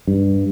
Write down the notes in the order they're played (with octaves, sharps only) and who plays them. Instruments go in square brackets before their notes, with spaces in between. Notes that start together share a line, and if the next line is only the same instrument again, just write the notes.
[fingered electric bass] G2